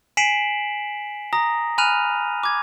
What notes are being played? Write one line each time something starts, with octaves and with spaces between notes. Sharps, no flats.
G#5 B6 C7 D7 E7 F#7
A#5 D#6 A#6
G#5 B5 F6 F#6 D#7 F7
D6 G#6